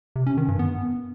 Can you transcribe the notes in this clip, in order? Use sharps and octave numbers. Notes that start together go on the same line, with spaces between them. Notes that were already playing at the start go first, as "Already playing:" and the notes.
C3
C#4
D#3
G2
B3